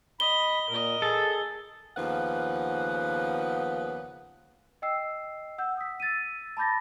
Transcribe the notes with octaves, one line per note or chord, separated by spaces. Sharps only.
D#5 B5 G7
A#2 A#4 D#5
G#4 A4
D#2 C#3 F3 B3 B4 F#5
D#5 G5 E6 C7
F#5 E6 G6
D#6 B6
E6 A6 B6 D#7
A5 B5 D6 G6 A6 A#6